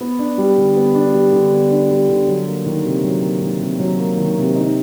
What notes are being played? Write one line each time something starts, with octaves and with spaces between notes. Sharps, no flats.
B3
D4
G3
D3
B3
D4
G3
D3
B3
D4
G3
D3
F#3
A#3
D#3
C3
F#3
A#3
D#3
C3
F#3
A#3
D#3
C3
D#4